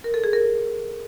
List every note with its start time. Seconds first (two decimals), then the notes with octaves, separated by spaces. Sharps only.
0.04 A#4
0.14 A4
0.24 G#4
0.33 A#4